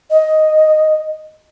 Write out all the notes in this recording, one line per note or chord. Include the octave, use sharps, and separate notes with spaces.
D#5